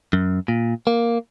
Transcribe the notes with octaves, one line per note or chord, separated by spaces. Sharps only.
F#2
A#2
A#3